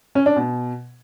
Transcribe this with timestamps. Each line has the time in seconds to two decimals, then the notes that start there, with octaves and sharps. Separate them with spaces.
0.15 C#4
0.26 D4
0.36 B2